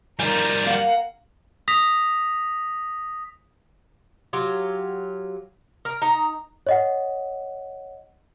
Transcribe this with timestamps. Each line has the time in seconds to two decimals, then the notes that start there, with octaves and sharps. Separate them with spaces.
0.19 G3 D#4 F4 A#4 G#5
0.66 A#3 F5 F#5
1.68 D#6 A#6 B6 F7
4.33 F#3 F4 G4
5.85 A#4
6.02 D#4 A#5
6.67 C#5 D#5 F#5